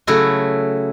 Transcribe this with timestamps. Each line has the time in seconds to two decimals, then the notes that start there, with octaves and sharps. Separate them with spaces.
0.07 C#3 F#3 A3 E4 F#4